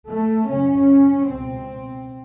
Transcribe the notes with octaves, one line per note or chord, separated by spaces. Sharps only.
A3
F#2 C#3 C#4
C#2 B2 C4